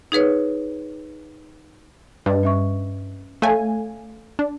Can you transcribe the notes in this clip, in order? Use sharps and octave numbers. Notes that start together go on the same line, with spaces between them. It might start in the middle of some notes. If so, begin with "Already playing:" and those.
D#4 G#4 B4 C#5
G2 B4 D#5
C#4 E5 C#6
A3 A4 C#5 F5 G#5
D4